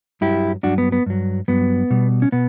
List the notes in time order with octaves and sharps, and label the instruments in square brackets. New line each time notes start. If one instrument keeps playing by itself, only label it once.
[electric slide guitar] G2 F#3 E4 G4
G2 F#3 D4 F#4
B3
B3
G2 F#3
G2 F#3 B3
B2 G3
C#4
B2 B3